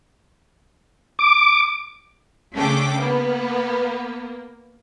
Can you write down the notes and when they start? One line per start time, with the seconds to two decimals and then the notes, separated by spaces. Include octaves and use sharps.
1.19 D6
2.55 C#3 A3 C#4 D4 G5 D6
2.99 A#3 B3